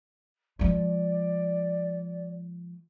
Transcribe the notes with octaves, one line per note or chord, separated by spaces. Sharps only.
F3 G#3 D5